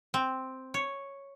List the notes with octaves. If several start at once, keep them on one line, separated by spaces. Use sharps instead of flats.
C4
C#5